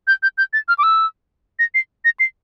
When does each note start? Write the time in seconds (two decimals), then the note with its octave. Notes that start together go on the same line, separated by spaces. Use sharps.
0.07 G6
0.23 G6
0.38 G6
0.53 A6
0.68 F6
0.78 D6
0.83 E6
1.59 A#6
1.75 C7
2.05 A#6
2.20 C7